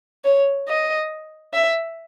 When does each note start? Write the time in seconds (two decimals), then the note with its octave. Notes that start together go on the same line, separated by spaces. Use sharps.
0.24 C#5
0.68 D#5
1.54 E5